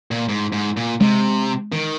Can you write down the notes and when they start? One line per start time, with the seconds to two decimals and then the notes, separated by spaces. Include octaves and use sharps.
0.11 A#2
0.29 G#2
0.53 G#2
0.77 A#2
1.01 C3 G#3
1.72 D#3